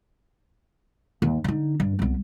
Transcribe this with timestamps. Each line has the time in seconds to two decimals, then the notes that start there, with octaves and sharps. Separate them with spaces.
1.22 D#2
1.44 D3 D#4
1.80 G2
1.99 C2 B3